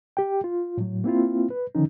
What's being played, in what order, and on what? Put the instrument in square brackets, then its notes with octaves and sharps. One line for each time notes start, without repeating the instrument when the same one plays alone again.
[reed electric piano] G4 G5
F4
A2 F#3
A#3 C4 E4 F4
B4
D3 D#3 F3 C#4 D#4